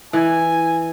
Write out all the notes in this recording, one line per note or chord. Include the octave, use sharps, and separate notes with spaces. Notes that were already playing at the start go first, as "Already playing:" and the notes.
E3 G#5